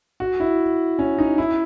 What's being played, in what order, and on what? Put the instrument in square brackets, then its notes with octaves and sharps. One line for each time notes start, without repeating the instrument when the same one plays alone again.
[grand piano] F#4
E4
C#4
D#4
E4